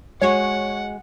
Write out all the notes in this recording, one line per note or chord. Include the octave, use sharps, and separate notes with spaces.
G#3 F#4 C#5 D#5 F#5